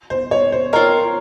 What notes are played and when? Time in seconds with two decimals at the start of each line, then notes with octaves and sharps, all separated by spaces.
0.10 C5
0.31 C#5
0.52 C5
0.73 C4 F4 A#4 C#5